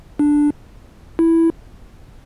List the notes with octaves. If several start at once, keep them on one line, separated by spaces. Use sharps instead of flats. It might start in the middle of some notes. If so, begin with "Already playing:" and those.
D4
E4